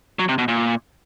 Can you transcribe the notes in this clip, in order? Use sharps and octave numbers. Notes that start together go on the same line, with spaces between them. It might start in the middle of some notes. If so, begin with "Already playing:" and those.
F#3
C3
B2
A#2